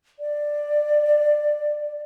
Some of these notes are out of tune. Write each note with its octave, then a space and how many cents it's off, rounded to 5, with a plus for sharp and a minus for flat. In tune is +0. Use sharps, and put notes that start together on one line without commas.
D5 +5